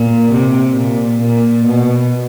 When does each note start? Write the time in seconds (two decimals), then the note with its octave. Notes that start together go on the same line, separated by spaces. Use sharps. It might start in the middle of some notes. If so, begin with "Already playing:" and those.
Already playing: A#2
0.31 C3
0.77 A#2
1.21 A#2
1.66 B2